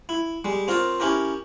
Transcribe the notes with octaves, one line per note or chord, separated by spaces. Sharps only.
E4
G3 G#3
C4 F4 A#4 C#5
C#4 E4 G4 A#4